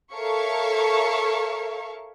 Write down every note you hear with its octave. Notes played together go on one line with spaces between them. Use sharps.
A4 A#4 C#5 E5 F5 C#6